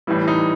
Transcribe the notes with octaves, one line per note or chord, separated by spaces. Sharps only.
A2 E3 G3
D#4